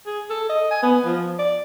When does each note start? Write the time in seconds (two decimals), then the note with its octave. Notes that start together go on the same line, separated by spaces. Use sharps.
0.06 G#4
0.30 A4
0.49 D#5
0.71 G#5
0.83 B3
1.05 F3
1.39 D5